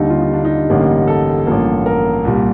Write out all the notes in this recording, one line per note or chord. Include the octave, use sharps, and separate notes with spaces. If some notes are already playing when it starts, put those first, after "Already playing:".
Already playing: D#2 D3 G3 D#4
F4
D#4
D4
D#4
A1 G2 D3 G3 A#3
A4
A1 G2 F3 A#3
A#4
C2 A#2 G3